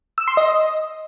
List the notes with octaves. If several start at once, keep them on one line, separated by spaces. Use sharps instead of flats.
E6
C6
D#5